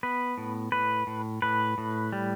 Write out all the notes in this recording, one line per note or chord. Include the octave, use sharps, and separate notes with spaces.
B3 B4
A2
A2 B4
A2
A2 B4
A2
G3